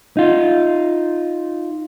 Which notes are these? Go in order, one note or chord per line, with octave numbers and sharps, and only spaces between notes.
D#4 F4